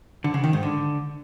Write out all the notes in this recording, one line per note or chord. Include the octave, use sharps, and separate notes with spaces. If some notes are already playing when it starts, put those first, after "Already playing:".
D3
C#3
D#3
G#2
D3